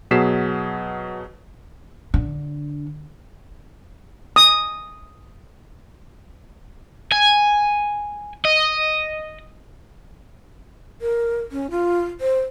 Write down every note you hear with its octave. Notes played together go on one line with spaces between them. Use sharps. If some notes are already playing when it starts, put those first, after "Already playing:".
B2 F#3 G#4 B6 C7 E7
D3
D#6
G#5
D#5
A#4
C#4
F4
C5